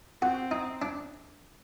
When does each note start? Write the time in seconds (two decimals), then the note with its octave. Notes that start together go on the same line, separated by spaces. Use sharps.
0.22 C4 F#4
0.51 D#4
0.82 D4